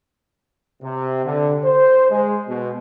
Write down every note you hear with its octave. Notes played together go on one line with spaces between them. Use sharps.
C3
D3
C5
G#3
B2